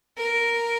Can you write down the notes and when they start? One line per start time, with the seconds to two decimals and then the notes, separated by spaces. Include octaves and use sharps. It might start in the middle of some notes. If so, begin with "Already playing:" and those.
0.18 A#4